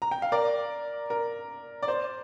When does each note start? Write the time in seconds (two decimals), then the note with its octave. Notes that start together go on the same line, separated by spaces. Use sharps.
0.02 A#5
0.11 G5
0.22 F5
0.32 A#4 D5
1.10 A#4
1.83 D5
1.88 C5